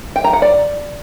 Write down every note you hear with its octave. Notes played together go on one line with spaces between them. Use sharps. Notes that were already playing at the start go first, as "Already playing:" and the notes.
G5
A#5
F#5
D5